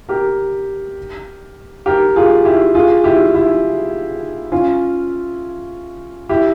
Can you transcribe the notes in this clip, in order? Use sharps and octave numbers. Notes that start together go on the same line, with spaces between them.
G4 A#4
G4 A#4
F4 G#4
E4 G4
F4 G#4
E4 G4
E4
C#4 F4
E4 G4